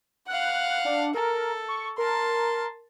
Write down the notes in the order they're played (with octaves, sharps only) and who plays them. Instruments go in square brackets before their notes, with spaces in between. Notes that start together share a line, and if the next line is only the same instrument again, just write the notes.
[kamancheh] F5 F#5 [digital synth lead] F#6
[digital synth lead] D4
[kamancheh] A4 [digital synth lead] A#4
[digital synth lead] C#6
[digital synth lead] A#4 [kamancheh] A5 C6